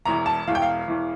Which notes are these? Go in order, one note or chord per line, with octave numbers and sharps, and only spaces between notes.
E1 E2 E3 A#5
A5
E1 E2 E3 F5
G5
F5
E1 E2 E3